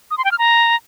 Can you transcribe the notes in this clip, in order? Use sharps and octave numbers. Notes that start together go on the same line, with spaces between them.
D#6
C6
G5
F6
A#5